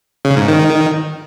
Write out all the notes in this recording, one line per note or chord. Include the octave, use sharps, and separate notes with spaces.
C#3
G#2
D#3